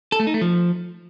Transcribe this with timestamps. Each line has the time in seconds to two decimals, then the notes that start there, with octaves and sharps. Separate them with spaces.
0.12 A4
0.20 A3
0.27 D#4
0.34 A3
0.41 F3